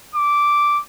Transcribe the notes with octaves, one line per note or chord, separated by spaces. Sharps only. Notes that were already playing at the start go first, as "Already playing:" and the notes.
D6